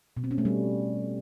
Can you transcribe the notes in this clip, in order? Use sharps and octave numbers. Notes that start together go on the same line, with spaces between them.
B2
C4
C#4
A3
G3